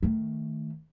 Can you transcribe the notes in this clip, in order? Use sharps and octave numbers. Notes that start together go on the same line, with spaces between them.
D#3 A3